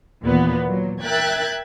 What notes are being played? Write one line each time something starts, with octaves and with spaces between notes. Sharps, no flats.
D#2 A#2 E3 B3
A#2 F#3
A#4 E5 G5 F#6 G#6 A6